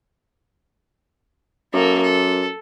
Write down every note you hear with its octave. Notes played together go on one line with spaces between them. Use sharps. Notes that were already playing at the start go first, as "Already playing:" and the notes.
F#2 A#3 A4
A4